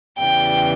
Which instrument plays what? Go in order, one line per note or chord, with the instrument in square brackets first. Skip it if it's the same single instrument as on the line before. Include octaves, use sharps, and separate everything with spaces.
[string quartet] E2 C#3 E3 G3 G5